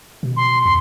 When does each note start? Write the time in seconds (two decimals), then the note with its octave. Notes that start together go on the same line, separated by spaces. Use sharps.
0.23 B2
0.37 C6
0.65 E2 C6